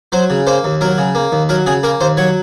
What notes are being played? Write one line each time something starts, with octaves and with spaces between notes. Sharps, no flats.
F#3 C5
C#3
A#3 C5
D#2
F#3 A#4
C#3
A#3
D#2
F#3 A#4
C#3 G#4
A#3 A#4
D#2 C5
F#3 C#5